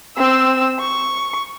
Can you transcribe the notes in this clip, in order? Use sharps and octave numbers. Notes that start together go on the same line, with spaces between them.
C4 E6
C#6